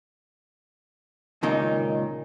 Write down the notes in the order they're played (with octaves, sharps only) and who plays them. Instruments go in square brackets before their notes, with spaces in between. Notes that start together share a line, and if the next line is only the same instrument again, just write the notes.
[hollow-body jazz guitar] C#2 A#2 D#3 D#4